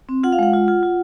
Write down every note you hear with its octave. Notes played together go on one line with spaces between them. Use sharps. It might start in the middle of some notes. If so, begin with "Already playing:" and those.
C4
F4 F#5
F5
G#3 F#5
F4
F4
F4